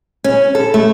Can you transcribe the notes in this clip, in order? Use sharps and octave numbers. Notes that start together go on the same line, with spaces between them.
C#4
A4
A3